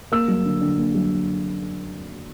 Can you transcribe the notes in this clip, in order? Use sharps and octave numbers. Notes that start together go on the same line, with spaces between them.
A#3 E6
F#3
D3
D3
A#3
F#3